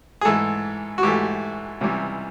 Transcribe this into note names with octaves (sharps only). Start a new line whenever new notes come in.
G#4
G#2 E3 A3 A4
F#4
G#2 E3 A3 G4
C#2 C3 E3 G3